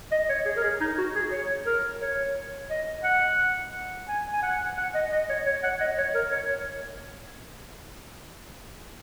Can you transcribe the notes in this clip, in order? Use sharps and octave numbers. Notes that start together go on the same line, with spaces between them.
D#5
C#5
G#4
A#4
G#4
D#4
F#4
G#4
C#5
A#4
C#5
D#5
F#5
G#5
G#5
F#5
F#5
D#5
D#5
C#5
C#5
F#5
D#5
C#5
A#4
C#5